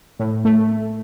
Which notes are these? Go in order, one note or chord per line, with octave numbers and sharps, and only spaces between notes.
A2
A3